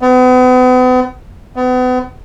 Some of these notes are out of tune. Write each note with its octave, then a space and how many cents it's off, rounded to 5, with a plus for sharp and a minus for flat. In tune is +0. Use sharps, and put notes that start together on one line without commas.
B3 +40
B3 +35